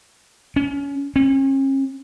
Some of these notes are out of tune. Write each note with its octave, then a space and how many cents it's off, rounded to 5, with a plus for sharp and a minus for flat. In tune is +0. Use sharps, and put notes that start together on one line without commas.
C#4 +25
C#4 -40